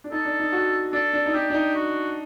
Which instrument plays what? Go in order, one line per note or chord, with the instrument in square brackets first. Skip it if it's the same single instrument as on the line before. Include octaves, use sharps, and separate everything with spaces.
[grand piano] D4
[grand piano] D#4 [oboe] A4
[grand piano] D4
D#4
F#4
[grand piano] D4 [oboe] A4
[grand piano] D4
D#4
[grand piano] D4 [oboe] G4
[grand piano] D4
D#4
[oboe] F#4